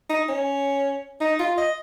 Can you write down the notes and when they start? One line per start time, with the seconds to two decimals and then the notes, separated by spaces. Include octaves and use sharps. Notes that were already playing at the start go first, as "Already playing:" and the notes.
0.09 D#4
0.29 C#4
1.21 D#4
1.39 F4
1.57 D#5